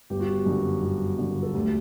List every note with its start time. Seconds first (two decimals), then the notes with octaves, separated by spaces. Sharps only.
0.10 G1 G4
0.20 F#4
0.30 G4
0.46 F#2 D3
0.82 G1 F#4
1.18 F#2 D3
1.43 A4
1.54 D2 G4